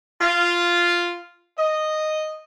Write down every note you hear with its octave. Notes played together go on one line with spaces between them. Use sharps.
F4
D#5